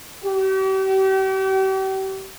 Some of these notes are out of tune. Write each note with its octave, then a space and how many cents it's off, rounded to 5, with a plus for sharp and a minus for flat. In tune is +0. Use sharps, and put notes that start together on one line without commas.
G4 -40